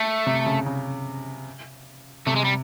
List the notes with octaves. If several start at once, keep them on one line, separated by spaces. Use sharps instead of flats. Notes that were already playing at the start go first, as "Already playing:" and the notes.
Already playing: A3
C3
C#3
C#3
C3 A3
G#3
G3